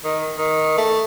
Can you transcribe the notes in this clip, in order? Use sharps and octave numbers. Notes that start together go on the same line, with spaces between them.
D#3
D#3
A3